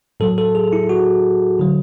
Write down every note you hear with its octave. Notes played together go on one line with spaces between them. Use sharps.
A2 F#3 A4
A4
G#4
E4
F#4
D3 F#3